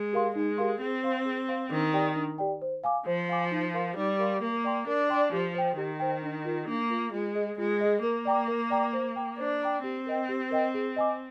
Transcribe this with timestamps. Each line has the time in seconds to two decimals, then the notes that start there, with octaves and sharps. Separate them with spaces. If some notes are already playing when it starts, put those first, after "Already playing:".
Already playing: G#3
0.13 G4 A#4 F5 C6
0.36 G#3 D#4
0.58 G4 A#4 F5 C6
0.80 C4 G#4
1.03 C5 F5 C6
1.25 G#4
1.48 C5 F5 C6
1.71 D#3 D4
1.94 G4 D5 G5
2.16 D4
2.38 G4 D5 G5
2.61 C5
2.83 F5 G#5 D6
3.06 F3 C5
3.29 F5 G#5 D6
3.51 D#4
3.74 A#4 F5 C6
3.96 G3 D#4
4.19 A#4 F5 C6
4.42 A#3 A#4
4.64 D5 G5 C6
4.87 D4 A#4
5.10 D5 G5 C6
5.32 F3 G4
5.55 C5 G5
5.77 D#3 G4
6.00 C5 G5
6.22 D4
6.45 F4 A#4
6.67 A#3 D4
6.90 F4 A#4
7.12 G#3 F4
7.35 G#4 D#5
7.58 G#3 F4
7.81 G#4 D#5
8.03 A#3 A#4
8.25 D5 G5 A#5 D6
8.48 A#4
8.70 D5 G5 A#5 D6
8.93 C5
9.16 G5 A#5 D6
9.38 D4 C5
9.61 G5 A#5 D6
9.83 C4 G4
10.06 A#4 D#5 G5
10.29 G4
10.51 A#4 D#5 G5
10.74 G#4
10.96 D#5 G#5 D6